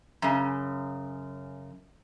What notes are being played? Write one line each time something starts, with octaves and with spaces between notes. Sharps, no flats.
F#2 C#3